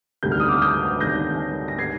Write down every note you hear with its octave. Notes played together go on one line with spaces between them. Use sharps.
D2 C3 D#3 G3 G6
F6
D#6
D6 F6
D#6 G6
D2 C3 D#3 G3 G6 A#6
A#6
D#3 G3 G#6 C7